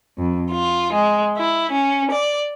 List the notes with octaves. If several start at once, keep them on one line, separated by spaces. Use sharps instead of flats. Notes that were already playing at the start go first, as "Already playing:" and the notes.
F2
F4
G#3
E4
C#4
D5